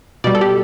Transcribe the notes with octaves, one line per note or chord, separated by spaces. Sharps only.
B2 G3 D5
A4
G4